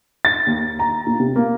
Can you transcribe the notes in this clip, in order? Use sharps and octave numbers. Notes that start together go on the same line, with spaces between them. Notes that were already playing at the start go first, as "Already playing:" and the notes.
A6
D#2
A#5
A#2
C3
A#3